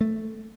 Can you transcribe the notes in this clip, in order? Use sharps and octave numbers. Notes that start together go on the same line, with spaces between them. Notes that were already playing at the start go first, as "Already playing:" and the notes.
A3